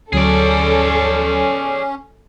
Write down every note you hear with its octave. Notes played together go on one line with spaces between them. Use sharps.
D2 F#3 C#4 G#4 A4 D5